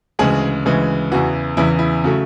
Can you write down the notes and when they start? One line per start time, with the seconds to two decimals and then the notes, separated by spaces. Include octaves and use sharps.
0.19 D2 C#3 E3 G#3 G#4
0.65 D2 C#3 E3 G#3
1.12 E2 C#3 E3 F#4
1.57 E2 C#3 E3 E4
1.79 E4
2.04 C#3 F#3 A3